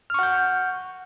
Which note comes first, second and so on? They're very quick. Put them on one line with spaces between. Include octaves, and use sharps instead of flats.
F6 C#6 F#5 G6